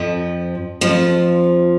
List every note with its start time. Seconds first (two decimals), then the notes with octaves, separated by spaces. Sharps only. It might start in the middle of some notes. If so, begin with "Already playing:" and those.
Already playing: F2 F3
0.81 F2 F3